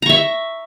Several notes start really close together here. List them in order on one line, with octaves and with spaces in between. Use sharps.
A#5 C#6 E5